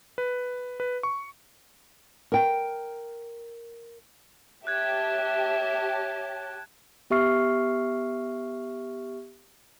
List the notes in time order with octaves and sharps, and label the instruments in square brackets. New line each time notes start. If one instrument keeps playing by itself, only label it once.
[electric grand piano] B4
B4
C#6
[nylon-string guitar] A#4 G5
[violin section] G4 C#5 A5 [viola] E5 [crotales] F#6 G#6
[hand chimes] B3 G4 E5 C#6 F6 C7